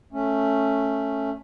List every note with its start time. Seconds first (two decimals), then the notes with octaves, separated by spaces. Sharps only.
0.13 A3 C#4